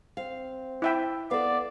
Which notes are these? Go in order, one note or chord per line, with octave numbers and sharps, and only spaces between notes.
C4 F5
E4 E5 G5
B3 A4 D5 F5